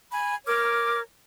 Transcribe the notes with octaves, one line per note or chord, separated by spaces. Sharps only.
G#5 B5
A#4 C#5 D6 F6